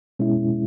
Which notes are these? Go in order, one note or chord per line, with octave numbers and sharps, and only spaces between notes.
B2 G#3 C#4 E4